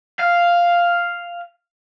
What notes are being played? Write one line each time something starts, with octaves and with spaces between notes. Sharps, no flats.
F5